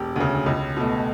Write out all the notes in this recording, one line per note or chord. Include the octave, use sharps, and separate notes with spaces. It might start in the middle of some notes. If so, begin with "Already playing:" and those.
Already playing: E1 G4
D2 C#3
C#2
B2 A3